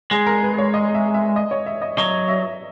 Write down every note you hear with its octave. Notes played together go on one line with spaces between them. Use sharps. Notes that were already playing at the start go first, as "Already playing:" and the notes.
G#3 G#4
A#4
B4
C#5
D#5
E5
E5
D#5
C#5
E5
D#5
F#3 D#5
E5